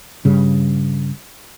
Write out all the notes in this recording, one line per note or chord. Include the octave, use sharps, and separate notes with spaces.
G2 C#3